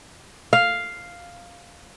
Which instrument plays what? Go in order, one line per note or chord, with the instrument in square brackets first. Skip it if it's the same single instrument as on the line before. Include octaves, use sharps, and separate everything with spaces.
[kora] F5